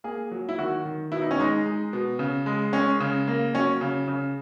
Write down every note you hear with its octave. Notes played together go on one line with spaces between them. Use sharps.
A#3 G#4
F#3
E4
D#3 F#4
D#3
B2 E4
D#4
C#4
G#3 D#4
G#3
B2
C#3
G#3
G#3 C#4
C#3
A#3
F#3 C#4
C#3
C#3